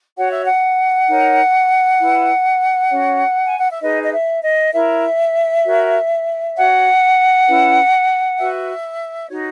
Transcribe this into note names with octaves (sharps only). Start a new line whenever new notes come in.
F#4 C#5 F#5
E5
F#5
D#4 A#4 C#5
E4 B4
C#4 F#4 C#5
G#5
F#5
E5
D#4 G#4 B4 D#5
D#5
E5
D#5
E4 A#4 C#5 E5
F#4 A#4 C#5
F#4 C#5 F#5
C#4 E4 B4
F#4 B4 E5
D#4 F#4 C#5